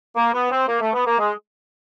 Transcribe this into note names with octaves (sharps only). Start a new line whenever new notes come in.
A#3
B3
C4
A#3
A3
B3
A#3
G#3